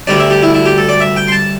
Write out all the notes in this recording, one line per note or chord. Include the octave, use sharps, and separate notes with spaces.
D2 D3 G3 D4 D5
E5
G4
E4
E4
G4
A4
D5
E5
G5
C6
A5